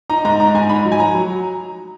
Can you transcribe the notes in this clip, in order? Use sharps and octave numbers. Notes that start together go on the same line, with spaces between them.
D#4 A#5
G#2 A#5
D#4 A#5
G#2 G#5
D#4 B5
F#3
G#5
F#3 A#5
F#3